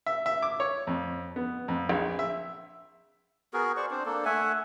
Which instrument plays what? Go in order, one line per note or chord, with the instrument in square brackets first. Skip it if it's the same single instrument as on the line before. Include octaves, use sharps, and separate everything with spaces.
[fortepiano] E5
E5
D6
C#5
F2
B3
F2
A#1
E5
[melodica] B3 F#4 G#4 A#4
C5 D5 C#6
C4 D4 C5
A#3 D4 A4
A3 E5 F#5 G#5